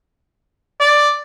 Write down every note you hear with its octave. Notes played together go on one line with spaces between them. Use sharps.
D5